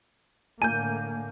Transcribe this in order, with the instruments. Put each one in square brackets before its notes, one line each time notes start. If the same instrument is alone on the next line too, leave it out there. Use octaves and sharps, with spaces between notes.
[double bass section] A2 D3 A#3 [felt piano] G#5 [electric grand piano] G6 D#7